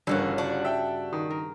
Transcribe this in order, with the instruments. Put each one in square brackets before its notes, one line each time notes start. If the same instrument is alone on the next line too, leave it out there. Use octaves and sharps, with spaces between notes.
[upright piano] G1 [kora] G2 C#3 F#5 [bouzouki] E3 A#3 F#4
[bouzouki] D4 F#4
[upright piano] E5 G5
D#3
[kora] A#4